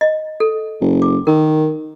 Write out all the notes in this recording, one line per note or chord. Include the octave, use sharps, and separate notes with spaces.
D#5
A4
F#1
D6
D#3 A#4